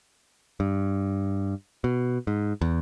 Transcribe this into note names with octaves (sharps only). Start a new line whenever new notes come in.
G2
B2
G#2
E2